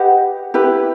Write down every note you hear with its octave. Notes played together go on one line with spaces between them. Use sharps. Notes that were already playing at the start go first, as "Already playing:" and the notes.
Already playing: G4 B4 D#5 F#5
E4 G4 B4